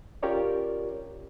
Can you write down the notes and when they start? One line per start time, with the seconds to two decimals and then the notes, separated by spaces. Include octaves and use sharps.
0.23 C#4 F4 G4 A#4 C#5 D5